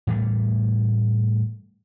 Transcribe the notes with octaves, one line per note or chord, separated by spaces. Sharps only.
A2 E3 G3 A3